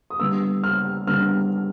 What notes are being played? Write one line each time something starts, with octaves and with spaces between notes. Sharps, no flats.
D#6
D3 G3 B3 E6
F6
D3 G3 B3 F6